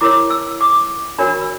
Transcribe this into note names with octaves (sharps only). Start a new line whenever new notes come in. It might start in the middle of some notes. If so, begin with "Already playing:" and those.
E4 A#4 C#5 D6
E6
D6
D4 F#4 A#4 C#5 B5
B5
E6